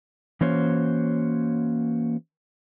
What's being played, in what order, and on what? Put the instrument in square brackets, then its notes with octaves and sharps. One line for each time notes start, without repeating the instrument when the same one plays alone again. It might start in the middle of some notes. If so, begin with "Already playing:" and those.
[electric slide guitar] E3 A#3 C#4 F#4 C5 C#5